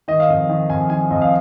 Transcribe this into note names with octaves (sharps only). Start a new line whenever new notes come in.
D#3 D#5
F5
F2 D#5
D#3
F2 G#5
D#3 G#5
F2 D#5
F5